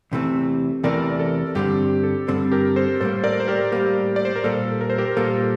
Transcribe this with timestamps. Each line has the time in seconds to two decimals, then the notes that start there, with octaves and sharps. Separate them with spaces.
0.12 E2 C3 E3 A3 C4
0.83 E2 C3 E3 A3 C4 A#4 D5
1.19 A4
1.55 G2 D3 G3 C4 G4
2.03 A4
2.28 G2 D3 G3 C4 A4
2.52 G4 A#4
2.76 A4 C5
3.00 A2 G3 A#3 A4 C5
3.24 A#4 D5
3.40 C5
3.48 G4 A#4
3.72 A2 G3 A#3 G4
4.16 D5
4.25 C5
4.36 A#4
4.44 A#2 G3 A#3 A4
4.81 A#4
4.90 C5
4.98 G4 A#4
5.17 A#2 G3 A#3 A4